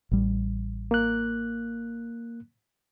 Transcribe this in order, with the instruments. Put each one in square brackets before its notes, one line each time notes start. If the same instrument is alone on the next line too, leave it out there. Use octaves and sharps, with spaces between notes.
[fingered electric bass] A1 G3
[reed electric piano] A#3 F#6